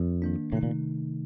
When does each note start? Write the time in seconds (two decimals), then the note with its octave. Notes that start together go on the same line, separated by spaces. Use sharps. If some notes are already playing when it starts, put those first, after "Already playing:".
Already playing: F2
0.22 D#3 A#3 D4
0.52 A2 C3 D#3 A3 D#4
0.63 A#2